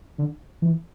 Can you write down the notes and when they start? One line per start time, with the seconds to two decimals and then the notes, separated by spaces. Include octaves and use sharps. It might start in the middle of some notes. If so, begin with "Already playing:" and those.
0.18 D3
0.62 E3